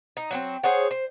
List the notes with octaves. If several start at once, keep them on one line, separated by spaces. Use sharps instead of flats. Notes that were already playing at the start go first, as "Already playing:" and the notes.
D#4
F#3 A#3 C4
G#4 C5 C#5 F#5
C5